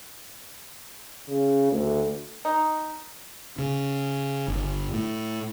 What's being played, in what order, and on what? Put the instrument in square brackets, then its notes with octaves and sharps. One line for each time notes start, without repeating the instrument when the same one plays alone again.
[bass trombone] C#3
D2
[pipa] D#4
[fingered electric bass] C#3
G1
A2